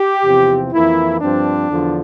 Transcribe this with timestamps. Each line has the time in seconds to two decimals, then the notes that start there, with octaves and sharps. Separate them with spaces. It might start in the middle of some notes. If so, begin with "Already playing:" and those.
Already playing: G4
0.25 E2 C3 F3 C4
0.73 F2 E3 A#3 E4
1.21 G2 F3 C4 D4
1.69 E2 D3 F3